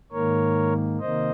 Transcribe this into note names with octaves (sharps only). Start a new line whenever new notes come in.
G#2 D#3 A#3 A#4 C#5
C3 D#3 A#3 C5 D#5